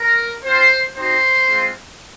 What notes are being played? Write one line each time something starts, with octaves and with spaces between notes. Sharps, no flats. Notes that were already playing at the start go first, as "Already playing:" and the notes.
Already playing: A#4
C4 F4 C5
C4 D#4 F#4 C5
G#3 C4 F4